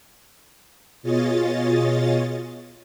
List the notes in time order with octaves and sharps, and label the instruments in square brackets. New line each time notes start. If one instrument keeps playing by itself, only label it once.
[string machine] B2 F4 G#4 C#5 D#5 A6